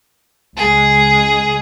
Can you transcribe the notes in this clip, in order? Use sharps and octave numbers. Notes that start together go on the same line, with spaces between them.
C#2 G#3 G#4